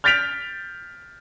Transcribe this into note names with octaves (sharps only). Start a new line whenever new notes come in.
F6 G6 A6 B6 D7 F7